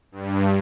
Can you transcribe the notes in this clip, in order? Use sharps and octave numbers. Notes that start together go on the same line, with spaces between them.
G2